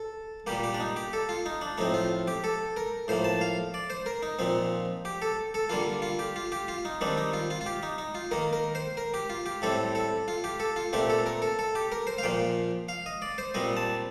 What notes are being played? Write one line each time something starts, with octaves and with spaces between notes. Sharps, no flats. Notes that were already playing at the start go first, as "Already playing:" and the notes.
Already playing: A4
A#2 G3 A#3 G4
G4
D4
D#4
G4
A4
F4
D#4
D4
A2 F3 C4 D#4
F4
G4
A4
A#4
A2 F3 A#3 C5
A5
F5
D5
C5
A#4
D#4
A#2 F3 C4
G4
A4
A4
D3 G3 A#3 F4
F4
G4
F4
G4
F4
D#4
D#3 G3 C4 D4
D#4
F4
F4
F4
G4
D#4
D#4
F4
D#3 A#3 A#4
A#4
C5
A#4
G4
F4
G4
A2 G3 C4 A4
A4
F4
G4
A4
F4
A#2 A3 C4 G4
A4
A#4
A4
A4
G4
A#4
C5
F5
A#2 F3 A#3 G5
F5
D#5
D5
C5
A#2 G3 C4 D#5
A5